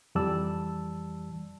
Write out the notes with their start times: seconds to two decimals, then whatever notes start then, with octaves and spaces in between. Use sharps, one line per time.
0.15 F2 E3 G3 D5 A5 E6